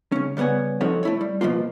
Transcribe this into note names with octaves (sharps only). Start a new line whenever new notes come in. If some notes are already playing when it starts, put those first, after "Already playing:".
C#3 C#4
C#3 G3 B3 F#5 G#5
F3 C4 D#4 F#4 A4 C#5
A3 E4 C#5
G3
B2 F3 A#3 F4